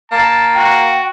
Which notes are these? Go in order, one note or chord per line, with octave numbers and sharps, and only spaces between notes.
A#3 A5
F#4 G5